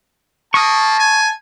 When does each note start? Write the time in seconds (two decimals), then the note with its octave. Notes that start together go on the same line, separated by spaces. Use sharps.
0.54 A#3 A5 C#6 D#6
0.99 G#5